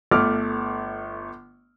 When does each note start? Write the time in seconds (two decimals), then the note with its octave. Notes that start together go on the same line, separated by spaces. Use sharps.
0.11 G1 A3 D6 F6